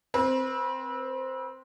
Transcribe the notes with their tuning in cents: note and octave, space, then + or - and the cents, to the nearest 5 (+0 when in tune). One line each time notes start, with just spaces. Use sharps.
C4 +0 B4 -35